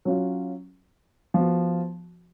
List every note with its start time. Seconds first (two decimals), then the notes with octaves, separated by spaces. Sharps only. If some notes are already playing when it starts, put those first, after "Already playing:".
0.05 F#3 C#4 F4
1.34 F3 B3 F#4